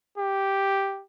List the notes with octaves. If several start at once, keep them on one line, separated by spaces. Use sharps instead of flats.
G4